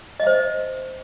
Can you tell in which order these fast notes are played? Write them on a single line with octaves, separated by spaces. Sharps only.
D#5 E5 C5